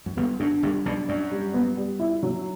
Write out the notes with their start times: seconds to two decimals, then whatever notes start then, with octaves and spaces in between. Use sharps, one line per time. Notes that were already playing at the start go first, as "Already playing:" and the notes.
0.06 F#2
0.17 G1 G2 B3
0.40 F#2 D3
0.63 G1 G2 G3
0.86 B1 B2 D4
1.08 F#2 D4
1.31 G3
1.54 B3
1.77 G3
1.99 E4
2.23 F#3